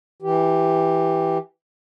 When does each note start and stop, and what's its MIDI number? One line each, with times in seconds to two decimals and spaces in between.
0.22 1.38 52
0.22 1.38 67